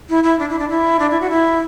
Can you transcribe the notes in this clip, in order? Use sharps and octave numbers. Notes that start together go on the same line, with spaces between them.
E4
E4
D4
E4
D4
E4
D4
E4
F#4
E4